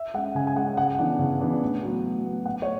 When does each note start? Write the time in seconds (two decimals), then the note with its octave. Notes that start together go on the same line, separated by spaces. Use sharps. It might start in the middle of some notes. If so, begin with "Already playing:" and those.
Already playing: E5
0.14 G#3 C#4 F#5
0.35 C#3 G#5
0.47 G#5
0.56 G#3 C#4 F#5
0.77 C#3 F#5
0.99 E3 B3 D4
1.19 C#3
1.41 E3 B3 D4
1.62 A2
1.83 F#3 B3
2.03 A2
2.25 F#3 B3
2.45 A2 F#5
2.62 C#5